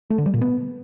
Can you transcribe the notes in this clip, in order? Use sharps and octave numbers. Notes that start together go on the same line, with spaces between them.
A3
D3
G3
A#2
B3